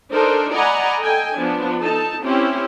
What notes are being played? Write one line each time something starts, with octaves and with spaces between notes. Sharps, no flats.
D4 D#4 A4 A#4 C5
D5 D#5 F#5 G#5 A#5 B5
A4 D#5 G5 G#5
F3 B3 D4
D#4 A4 A5
C4 C#4 E4 G4 C5